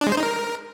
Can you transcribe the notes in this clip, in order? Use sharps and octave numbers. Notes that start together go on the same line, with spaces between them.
D4
G#3
C5
D#4
A#4